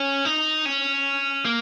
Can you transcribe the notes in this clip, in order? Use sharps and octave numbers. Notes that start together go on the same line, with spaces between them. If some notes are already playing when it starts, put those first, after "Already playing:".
Already playing: C#4
D#4
C#4
A#3